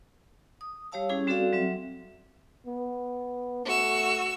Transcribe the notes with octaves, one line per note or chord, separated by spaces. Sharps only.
D#6
G3 G4 C#5 F5 A5 E6
G3 C#4 E4 G#4 D6
G3 C4 F#4 A4 D5 F5
F#3 C4 E5
B3
A3 F#4 E6